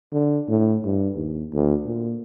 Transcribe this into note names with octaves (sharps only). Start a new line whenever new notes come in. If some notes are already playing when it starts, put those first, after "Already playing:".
D3
A2
G2
D#2
D2
A#2